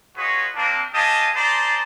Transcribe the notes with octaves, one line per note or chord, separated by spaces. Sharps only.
F4 F#4 G#4 B4 C#5 D#5
A#3 C4 D4
G4 D#5 F5 G#5 A5 D#6
G#4 C5 D5 A5 A#5 C6